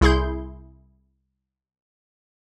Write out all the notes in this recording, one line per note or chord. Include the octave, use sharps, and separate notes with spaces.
C2 E4 G#4 C6 G6